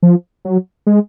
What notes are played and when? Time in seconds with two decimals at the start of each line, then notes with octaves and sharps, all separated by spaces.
0.03 F3
0.45 F#3
0.87 G#3